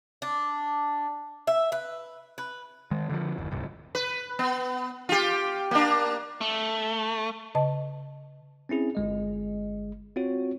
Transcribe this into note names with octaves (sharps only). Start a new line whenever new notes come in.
D4
E5
B4
B4
D#3 G#3
D3 D#3 F3
F#1 D#2
D1 C2 G2
B4
B3
F4 G4
A#3 D4
A3
C#3 D#5 A5
C4 C#4 E4 G#4
G1 G#3 D#5
C4 F4 F#4 C#5